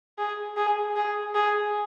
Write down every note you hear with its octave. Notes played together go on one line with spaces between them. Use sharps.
G#4
G#4
G#4
G#4